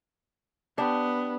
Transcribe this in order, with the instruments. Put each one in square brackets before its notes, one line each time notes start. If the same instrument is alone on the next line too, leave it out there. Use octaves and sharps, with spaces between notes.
[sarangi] B3 [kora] D4 G4